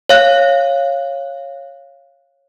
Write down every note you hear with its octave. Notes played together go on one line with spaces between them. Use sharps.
C#5 F5 F#6